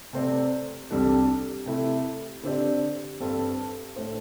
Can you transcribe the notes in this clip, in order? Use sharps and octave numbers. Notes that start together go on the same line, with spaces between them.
C3 A3 C4 A4 D5
C2 C3 G3 D4 A4
C3 A3 E4
D3 C4 G4 D5
G2 G3 C4 A4
A2 A3 D4 C5